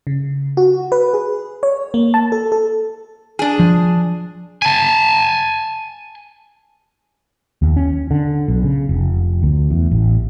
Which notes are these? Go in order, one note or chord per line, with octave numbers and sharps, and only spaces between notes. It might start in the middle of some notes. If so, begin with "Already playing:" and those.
C#3
F#4
B4
G#4
C#5
A#3
A5
A4
A4
D4 G#4
F3
G#5 A5
D#2
C#4
D3
B1
C#3
F1
D2
E2
A1